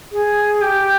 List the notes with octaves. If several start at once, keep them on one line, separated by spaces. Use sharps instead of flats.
G#4
G4